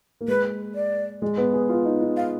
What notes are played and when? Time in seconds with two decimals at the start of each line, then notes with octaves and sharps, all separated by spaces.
0.21 A#3
0.28 G#3 B4
0.75 D5
1.22 G#3
1.37 B3
1.53 G#4
1.69 F4
1.85 D#4
2.01 D#4
2.17 F5